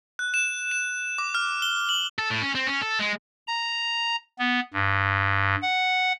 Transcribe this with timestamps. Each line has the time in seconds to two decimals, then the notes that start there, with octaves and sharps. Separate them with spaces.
0.19 F#6
0.34 E7
0.71 E7
1.18 D6
1.35 F6
1.62 G7
1.89 F#7
2.19 A4
2.30 A2
2.42 C#4
2.55 C4
2.67 C#4
2.82 A4
2.99 G#3
3.47 A#5
4.39 B3
4.74 G2
5.62 F#5